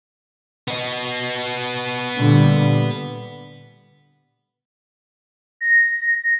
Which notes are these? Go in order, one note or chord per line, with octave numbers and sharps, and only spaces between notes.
B3 D#5
A#2 D3 G3
A#6